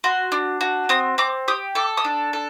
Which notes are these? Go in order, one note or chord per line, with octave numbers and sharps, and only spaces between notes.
F#4 C6
D4
F#4
C4 D#6
C4 D6
G4 D#6
A4 D6
D#6
D4
A4